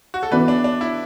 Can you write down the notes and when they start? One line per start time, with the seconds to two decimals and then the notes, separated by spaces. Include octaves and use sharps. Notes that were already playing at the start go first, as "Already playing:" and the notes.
0.14 F#4
0.23 A4
0.31 E3 B3 F#4 B4 D5
0.48 D4
0.64 D4
0.81 E4